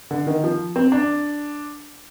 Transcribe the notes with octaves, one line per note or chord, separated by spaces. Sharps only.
D3
D#3
F3
C4
D4